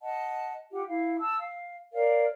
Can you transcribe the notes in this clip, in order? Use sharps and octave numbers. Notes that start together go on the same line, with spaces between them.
D#5 F#5 A5
F4 G4 F#5
E4 F5
A5 E6
F5
A#4 C#5 D5 F5